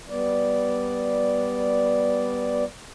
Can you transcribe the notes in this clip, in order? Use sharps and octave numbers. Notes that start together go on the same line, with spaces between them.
G3 B3 D5